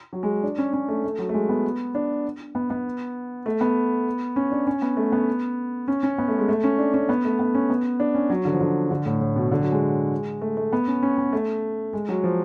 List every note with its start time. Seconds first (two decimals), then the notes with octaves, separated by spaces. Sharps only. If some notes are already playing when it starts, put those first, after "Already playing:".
0.13 F#3
0.23 G#3
0.43 D4
0.58 C#4
0.73 C#4
0.89 A3
1.04 A3
1.18 F#3
1.29 A3
1.34 G#3
1.49 B3
1.95 D4
2.55 B3
2.70 B3
3.46 A3
3.61 B3
4.36 C#4
4.51 D4
4.67 C#4
4.82 B3
4.97 A3
5.12 B3
5.88 C#4
6.03 C#4
6.18 B3
6.28 A3
6.38 G#3
6.49 A3
6.64 C#4
6.79 D4
6.94 C#4
7.09 B3
7.25 A3
7.39 B3
7.55 C#4
7.70 B3
8.00 D4
8.15 C#4
8.30 F#3
8.45 D3
8.53 F3
8.60 D3
8.91 D3
9.06 A2
9.21 A2
9.36 B2
9.52 D3
9.61 F#3
9.72 G#3
10.42 A3
10.57 A3
10.73 B3
10.87 C#4
11.03 C#4
11.18 B3
11.33 A3
11.93 G#3
12.09 F#3
12.24 F3